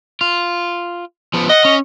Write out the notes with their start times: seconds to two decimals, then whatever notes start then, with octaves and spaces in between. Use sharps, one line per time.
0.21 F4
1.34 F3 B3
1.49 D#5 F#5
1.65 C#4